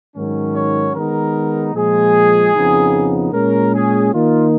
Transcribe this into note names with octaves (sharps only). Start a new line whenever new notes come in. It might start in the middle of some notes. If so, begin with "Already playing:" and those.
G#2 D#3 F#3 C#4
C#5
D#3 G#3 B3 D#4 A#4
A#2 F3 G#3 G#4
F2 C#3 F3 B3 D#4
A#2 G#3 C#4 A#4
G#4
D#3 A#3 D#4 F4